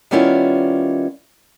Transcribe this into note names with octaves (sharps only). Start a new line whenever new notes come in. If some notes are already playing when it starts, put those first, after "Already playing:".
D#3 G3 B3 C#4 E4 F4